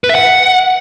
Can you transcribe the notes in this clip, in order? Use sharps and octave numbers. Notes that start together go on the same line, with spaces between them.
B4
E5
F#5